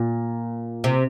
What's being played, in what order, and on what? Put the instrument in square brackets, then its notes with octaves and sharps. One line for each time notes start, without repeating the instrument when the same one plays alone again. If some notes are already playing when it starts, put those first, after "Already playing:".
Already playing: [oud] A#2
C3